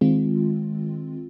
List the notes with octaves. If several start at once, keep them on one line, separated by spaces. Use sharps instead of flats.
D#3 G#3 C4 F4